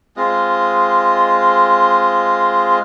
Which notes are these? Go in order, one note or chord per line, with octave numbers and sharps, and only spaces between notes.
G#3 C4 F4 D#5